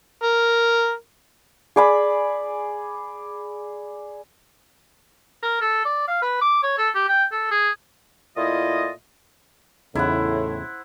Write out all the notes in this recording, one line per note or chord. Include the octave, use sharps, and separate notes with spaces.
A#4
G#4 D5 B5
A#4
A4
D5
F5
B4
D6
C#5
A4
G4
G5
A4
G#4
A#2 A3 E4 F4 D#5
E2 A2 C#3 D#4 E4 C5 F#5